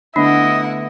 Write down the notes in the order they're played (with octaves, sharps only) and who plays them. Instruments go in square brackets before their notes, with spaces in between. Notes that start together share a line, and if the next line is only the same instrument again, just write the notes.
[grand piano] D3 A3 B3 [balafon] D4 [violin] E4 F#5 [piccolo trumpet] D#5